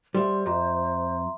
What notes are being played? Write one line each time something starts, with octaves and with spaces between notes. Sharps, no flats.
G3 C5 E5 C6
F2 E5 A#5 C6